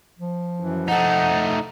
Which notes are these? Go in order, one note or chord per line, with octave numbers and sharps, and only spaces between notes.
F3
F#2 E3
A3 D#4 D#5 F#5